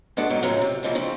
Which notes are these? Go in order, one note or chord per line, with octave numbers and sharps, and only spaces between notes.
G#3 B3 D4 F#4 A4
G#2 B2 D#3 F#3
F#2 A2 C#3 F3 F#3
C3
A#2 E3 F3 G3 G#3
C#3 F3 C4 D4